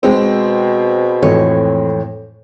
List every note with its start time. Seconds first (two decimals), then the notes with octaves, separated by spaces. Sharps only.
0.03 B2 G#3 C4
1.22 F2 A2 E3 C#5